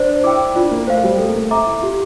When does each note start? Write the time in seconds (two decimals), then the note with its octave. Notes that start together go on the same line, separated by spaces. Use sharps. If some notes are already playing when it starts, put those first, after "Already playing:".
Already playing: D4 C5
0.24 E4 G5 D6
0.55 D4 F4
0.71 A#3
0.87 A3 C5 F5
1.04 G3
1.19 A3 A4
1.29 A#3
1.35 A3
1.51 C4 E5 A#5 D6
1.66 E4
1.82 F4 G4